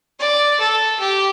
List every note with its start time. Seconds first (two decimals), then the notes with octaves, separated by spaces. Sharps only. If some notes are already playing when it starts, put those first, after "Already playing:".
0.20 D5
0.60 A4
1.00 G4